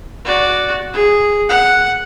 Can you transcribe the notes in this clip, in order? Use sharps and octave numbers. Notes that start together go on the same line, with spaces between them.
F#4 D5
G#4
F#5